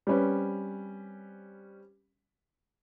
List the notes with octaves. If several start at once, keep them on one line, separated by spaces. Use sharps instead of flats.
G3 C4 C#4 B4